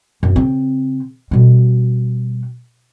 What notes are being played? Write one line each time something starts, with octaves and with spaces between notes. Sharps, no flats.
F#2
C#3 C4
B2 G3